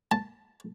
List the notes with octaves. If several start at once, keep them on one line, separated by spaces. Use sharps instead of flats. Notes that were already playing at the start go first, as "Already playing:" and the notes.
A5